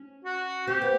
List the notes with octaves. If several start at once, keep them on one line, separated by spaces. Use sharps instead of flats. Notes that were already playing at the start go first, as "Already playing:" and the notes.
Already playing: C#4
F#4
C4 G4
B3